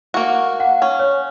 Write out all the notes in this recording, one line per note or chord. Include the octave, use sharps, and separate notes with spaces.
A#3 F#4
F5 F#5
C#4
C#5